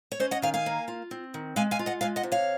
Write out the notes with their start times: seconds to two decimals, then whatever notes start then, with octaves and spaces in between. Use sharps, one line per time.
0.12 C#5
0.20 C#4 C5 D#5
0.31 D#5 F#5
0.42 D#3 F5 G#5
0.54 F5 G#5
0.66 A#3
0.88 F4
1.11 C4
1.34 D#3
1.56 G#3 F5 G#5
1.71 F5 G#5
1.79 F4
1.86 D#5 F#5
2.01 G#3 F5 G#5
2.16 D#5 F#5
2.23 C3
2.32 C#5 F5